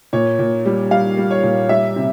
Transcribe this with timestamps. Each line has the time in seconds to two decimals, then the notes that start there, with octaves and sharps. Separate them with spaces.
0.13 A#2 C#5
0.39 A#2
0.66 G3
0.91 G3 F5
1.17 G3
1.31 C#5
1.43 A#2
1.69 G3 E5
1.96 C3